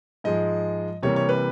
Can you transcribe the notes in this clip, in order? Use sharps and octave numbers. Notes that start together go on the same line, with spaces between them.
G#2 F3 G#3 D#5
C3 E3 G3 A#3 C#5
C#5
B4